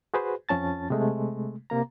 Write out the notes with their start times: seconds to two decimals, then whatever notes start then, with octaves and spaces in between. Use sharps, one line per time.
0.14 F#4 G#4 B4 C5
0.49 F2 F3 C#4 A5 A6
0.90 C3 G#3 A3
1.70 C3 A#3 A#5